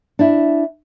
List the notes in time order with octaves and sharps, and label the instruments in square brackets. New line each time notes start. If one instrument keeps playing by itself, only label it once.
[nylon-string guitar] D4 E4